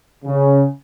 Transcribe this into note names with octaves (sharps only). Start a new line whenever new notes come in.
C#3